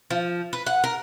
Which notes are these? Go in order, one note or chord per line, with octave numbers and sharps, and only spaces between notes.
F3
B4
F#5
A#4